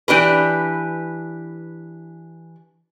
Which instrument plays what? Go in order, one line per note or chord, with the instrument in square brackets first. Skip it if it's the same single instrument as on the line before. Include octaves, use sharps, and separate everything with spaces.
[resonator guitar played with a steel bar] E3 D4 G4 B4